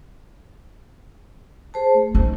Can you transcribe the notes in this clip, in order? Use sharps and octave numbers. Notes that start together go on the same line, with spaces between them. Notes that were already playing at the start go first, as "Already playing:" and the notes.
G#4 C5 A5
A3
D#4